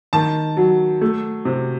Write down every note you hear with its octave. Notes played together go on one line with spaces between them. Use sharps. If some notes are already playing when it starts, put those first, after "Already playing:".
D#3 A5
F#3
A3
C3